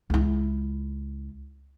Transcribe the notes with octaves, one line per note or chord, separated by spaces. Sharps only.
C#2 E4